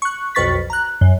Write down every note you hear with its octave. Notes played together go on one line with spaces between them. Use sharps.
C#6 F#6
B1 F2 B4 C#6 A6 B6
A#5 F#6
F#2